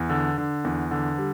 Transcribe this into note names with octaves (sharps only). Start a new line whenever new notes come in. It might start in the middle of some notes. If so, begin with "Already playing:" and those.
Already playing: E2
D3
D3
E2
D3
G3